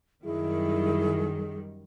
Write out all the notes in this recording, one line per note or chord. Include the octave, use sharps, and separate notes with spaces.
F#2 D#3 G3 E4 G#4